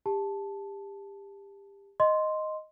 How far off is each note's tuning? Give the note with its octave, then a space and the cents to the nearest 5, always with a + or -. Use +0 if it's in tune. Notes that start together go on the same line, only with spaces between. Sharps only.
G4 +25 A5 -5
D#5 +0 C6 +0